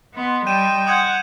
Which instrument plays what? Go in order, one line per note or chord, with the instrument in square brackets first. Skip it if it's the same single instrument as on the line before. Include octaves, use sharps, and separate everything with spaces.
[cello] B3 [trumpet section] D#5 C6
[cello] G3 [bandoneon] G5 [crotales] G6 D#7 E7
[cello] F#5 [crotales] D#6 G6 G#6